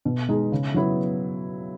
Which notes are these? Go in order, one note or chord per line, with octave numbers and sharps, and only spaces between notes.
B2
G#3 D#4 G#4
C#3
F#3 B3 E4 B4